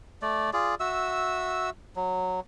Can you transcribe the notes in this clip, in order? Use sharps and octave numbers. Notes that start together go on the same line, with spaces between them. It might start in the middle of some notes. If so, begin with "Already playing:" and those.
A3 D5
F4 G#4 D5
F#4 E5 E6
F#3